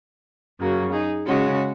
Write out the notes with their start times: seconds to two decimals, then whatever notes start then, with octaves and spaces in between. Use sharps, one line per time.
0.60 F#2 C#3 F#3 A#3
0.93 D#4 G#4
1.26 C#3 G#3 C#4 F#4